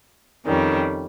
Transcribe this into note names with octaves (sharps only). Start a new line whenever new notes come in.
F2 D#3 G3 C#4